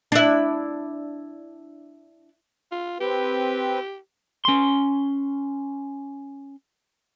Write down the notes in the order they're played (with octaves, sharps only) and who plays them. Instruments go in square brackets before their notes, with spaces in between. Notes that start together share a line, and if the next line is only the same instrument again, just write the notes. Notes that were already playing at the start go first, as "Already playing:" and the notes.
[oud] D4 E4
[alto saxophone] F4
[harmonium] C4 B4 [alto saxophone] G4
[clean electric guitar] C#4 C6